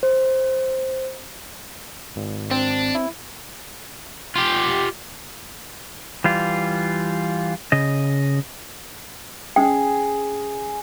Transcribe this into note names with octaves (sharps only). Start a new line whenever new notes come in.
C5
G#1
C4 D4
E4
F4 G4
E3 G3 F4
C#3 D#5
C#4 G#4 G5